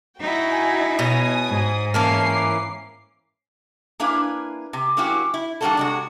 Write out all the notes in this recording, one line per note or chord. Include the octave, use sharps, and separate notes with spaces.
D#4 E4 F#4 G5
G#5
B2 C#5 G#5 D#6
G#2
E3 A#3 C#4 A#4 A5 C7
D6
A#3 D4 E4 B4 F5 G#5
C3
F#3 A#3 C#4 E4 F#4 G4
E4
D#3 G3 A#3 D4 F#4 A4
C3 G#3 F#4